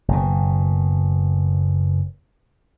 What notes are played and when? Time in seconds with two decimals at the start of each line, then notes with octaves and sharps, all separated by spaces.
0.08 F#1 B2